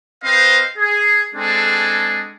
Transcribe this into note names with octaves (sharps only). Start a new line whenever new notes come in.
C4 B4 C5 D#5 F5
G#4
G#3 C4 D4 G#4 A4